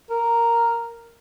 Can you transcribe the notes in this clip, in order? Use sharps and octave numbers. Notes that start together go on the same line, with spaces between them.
A#4